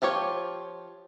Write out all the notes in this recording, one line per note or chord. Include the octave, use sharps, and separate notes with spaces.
F3 F4 G4 C#5